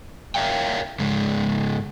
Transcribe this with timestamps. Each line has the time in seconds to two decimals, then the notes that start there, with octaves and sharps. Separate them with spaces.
0.35 A#4 C#5 D5 E5 F5 G5
1.00 G#2 C#3 G#3